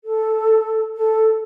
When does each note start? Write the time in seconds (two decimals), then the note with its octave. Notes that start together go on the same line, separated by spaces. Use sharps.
0.04 A4
0.95 A4